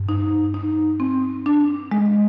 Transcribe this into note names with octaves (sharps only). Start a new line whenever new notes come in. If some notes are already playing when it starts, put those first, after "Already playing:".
Already playing: G2
D#4
D#4
C4
D4
G#3